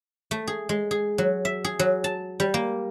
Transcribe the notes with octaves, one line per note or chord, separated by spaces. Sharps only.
A3
G#4
G#3
G#4
F#3
E5
G#4
F#3
A5
G3
A#3